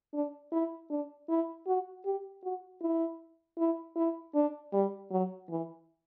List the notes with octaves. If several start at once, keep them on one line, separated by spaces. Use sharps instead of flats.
D4
E4
D4
E4
F#4
G4
F#4
E4
E4
E4
D4
G3
F#3
E3